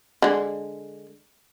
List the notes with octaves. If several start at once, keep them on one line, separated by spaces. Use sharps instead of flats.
D3 G#3